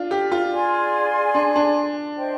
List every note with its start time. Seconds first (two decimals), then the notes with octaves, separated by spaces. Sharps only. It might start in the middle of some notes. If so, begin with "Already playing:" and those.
Already playing: D4 F4
0.11 G4
0.32 F4
0.51 G#4 D5 G#5 C6
1.35 D4
1.56 D4
2.18 C5 D#5 G5 C6